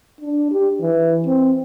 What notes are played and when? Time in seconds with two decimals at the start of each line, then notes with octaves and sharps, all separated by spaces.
0.21 D4
0.52 G4
0.81 E3
1.27 C4